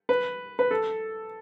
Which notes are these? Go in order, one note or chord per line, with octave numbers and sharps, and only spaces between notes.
B4
B4
A4